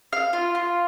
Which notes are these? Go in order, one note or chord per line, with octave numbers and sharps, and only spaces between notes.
F5
F4
F4